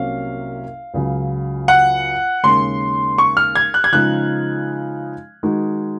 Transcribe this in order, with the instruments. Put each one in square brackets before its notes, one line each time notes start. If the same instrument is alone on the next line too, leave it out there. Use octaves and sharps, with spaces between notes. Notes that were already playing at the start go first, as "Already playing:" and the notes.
Already playing: [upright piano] C2 C3 F#3 A#3 C#4 [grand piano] F5
[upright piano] C#2 C#3 F#3
[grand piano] F#5
[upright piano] D#2 C#3 G#3 C#4 [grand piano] C6
[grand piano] C#6
F6
G#6
F#6
G#6
[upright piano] C#3 F3 G#3 D#4 [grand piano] F#6
[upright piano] D#3 G#3 D#4 F#4